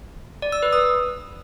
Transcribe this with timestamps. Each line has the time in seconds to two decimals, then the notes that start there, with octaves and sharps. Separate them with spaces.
0.42 D5
0.52 E6
0.63 B4
0.73 D#6